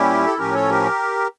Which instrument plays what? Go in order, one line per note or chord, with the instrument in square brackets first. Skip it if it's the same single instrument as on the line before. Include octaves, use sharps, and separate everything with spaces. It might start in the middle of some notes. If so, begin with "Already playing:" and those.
Already playing: [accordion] A#2 G3 C#4 E4 G4
A4
A2 F3 C#4 G4 A#4
A4 C#5
G4 A#4